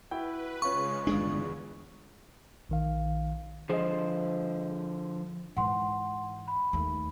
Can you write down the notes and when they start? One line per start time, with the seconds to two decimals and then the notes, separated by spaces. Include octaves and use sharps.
0.11 E4 F#4 B4 G5
0.62 C#3 G#3 C#4 F4 C#6
1.07 G1 E2 G#3 D4 F4 G#4
2.69 A#1 D#3 F5
3.69 D3 F3 G#4 C5 D#5
5.57 G#2 E3 F#5 C6
6.48 B5
6.73 D#2 A3